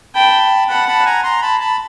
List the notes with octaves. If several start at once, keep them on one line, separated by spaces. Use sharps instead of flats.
G5 A5 B5
F#5 A5 B5
A5 B5
G#5 A#5
A#5 C6
A5 B5
A5 B5